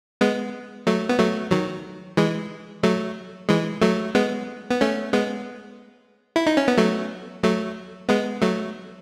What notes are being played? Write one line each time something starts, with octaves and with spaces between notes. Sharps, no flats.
G#3 B3
F#3 A3
B3
F#3 A3
D#3 F#3
E3 G#3
F#3 A3
E3 G#3
F#3 A3
G#3 B3
B3
A3 C#4
G#3 B3
E4
D#4
C#4
B3
F#3 A3
F#3 A3
G#3 B3
F#3 A3